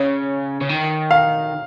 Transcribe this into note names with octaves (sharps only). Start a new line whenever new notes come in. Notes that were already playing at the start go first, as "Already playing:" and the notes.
Already playing: C#3 C#5
C#3
D#3
F5